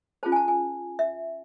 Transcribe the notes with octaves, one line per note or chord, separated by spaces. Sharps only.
C#4 F4 G#4 C5 A5
G#5
A5
G#5
E5